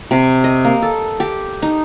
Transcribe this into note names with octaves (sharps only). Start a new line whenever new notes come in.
C3
D#5
A#3
A4
G4
D#4